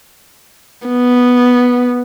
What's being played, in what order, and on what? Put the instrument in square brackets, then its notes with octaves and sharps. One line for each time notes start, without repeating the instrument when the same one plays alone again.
[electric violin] B3